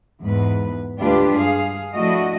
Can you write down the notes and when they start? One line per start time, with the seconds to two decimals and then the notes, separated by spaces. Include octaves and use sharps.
0.20 E2 G#2 B4
1.00 D2 G#3 D4 F4 G4 B4
1.34 G2 G#4 F5
1.94 F3 A3 D4 E4 F#4 D#5